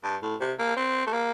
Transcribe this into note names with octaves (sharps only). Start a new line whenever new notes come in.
G2
A2
C3
A#3
C4
A3
A#3